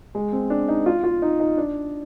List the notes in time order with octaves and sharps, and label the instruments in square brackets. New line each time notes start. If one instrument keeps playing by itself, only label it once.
[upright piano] G#3
C4
D4
D#4
F4
F4
D#4
D#4
D4